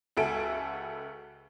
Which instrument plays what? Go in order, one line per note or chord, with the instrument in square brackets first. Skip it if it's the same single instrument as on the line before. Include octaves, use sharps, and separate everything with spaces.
[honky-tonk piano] C#2 F#4 A4 E5 G#5 D7